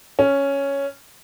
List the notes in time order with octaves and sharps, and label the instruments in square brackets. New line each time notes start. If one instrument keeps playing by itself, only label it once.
[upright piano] C#4